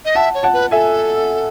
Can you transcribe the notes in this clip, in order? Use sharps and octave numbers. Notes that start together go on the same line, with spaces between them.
D#5
E5 F#5 A5
C#5
F#5 A5
B4
A4 E5 G#5